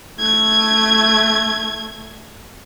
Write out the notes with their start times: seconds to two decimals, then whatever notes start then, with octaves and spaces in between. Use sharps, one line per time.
0.19 A3 G#6